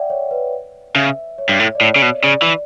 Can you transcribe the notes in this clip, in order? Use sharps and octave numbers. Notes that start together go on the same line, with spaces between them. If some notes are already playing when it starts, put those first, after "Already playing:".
Already playing: D5 E5 F#5 G5
C#5
B4
C#3 E5
C#5
G2
A2
D5
A2 C#5
C#3
B2
C#3 D5
E3 D5